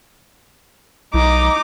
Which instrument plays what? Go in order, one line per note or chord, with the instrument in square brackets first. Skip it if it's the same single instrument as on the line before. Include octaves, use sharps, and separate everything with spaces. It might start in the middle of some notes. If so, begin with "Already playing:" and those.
[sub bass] B1 [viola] D#4 D6